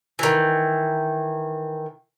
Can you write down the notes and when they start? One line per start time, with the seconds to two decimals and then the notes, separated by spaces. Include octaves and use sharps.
0.19 D#3 E3